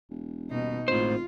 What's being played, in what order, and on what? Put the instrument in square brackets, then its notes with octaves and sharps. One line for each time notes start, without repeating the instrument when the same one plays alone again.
[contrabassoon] E1
[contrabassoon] D#1 [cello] B2 D#4
[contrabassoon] G#1 [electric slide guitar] A2 C5 [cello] F4